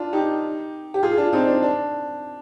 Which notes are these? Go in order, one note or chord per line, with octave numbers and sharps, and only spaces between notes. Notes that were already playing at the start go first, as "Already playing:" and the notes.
Already playing: D4 F4
D#4 G4
G4
F4 G#4
D4 F4
C4 D#4
D4
D4